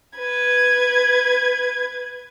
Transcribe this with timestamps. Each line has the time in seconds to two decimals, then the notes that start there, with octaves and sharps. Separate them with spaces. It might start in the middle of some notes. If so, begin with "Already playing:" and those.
0.18 B4 G#6